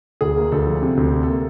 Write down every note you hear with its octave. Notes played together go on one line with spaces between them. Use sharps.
D2 G#4
A#3
D2 A4
F3
C3 A4
D2
C3
A4
A#3